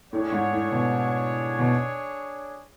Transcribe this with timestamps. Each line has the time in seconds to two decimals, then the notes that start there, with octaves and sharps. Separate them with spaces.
0.12 A2 D4 G#4 C#5
0.32 G#2
0.52 A2
0.72 B2
1.59 B2